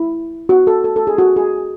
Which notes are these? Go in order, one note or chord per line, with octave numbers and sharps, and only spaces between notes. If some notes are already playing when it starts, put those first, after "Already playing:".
Already playing: E4
F#4
A4
A4
A4
G#4
F#4
G#4